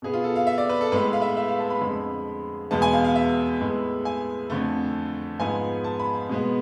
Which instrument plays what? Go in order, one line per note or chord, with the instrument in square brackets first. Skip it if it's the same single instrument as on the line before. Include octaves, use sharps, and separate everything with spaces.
[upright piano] B2 B3 G#4
F4
A4
F5
E5
D5
B4
A4
A2 G#3 B3 B4
F5
E5
E5
F5
A5
B5
F2 D3 G#3
E2 B2 G#3 B3 A5
G#5
F5
F5
E5
A2 G#3 B3
G#5
F2 D3 A3
G#2 F3 G#3 B3 G#5
A5
B5
B2 G#3 B3